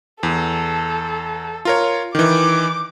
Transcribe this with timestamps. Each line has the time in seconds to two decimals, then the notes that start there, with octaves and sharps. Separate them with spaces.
0.23 E2 A4
1.65 F4 A#4 C#5
2.15 D#3 E3 D6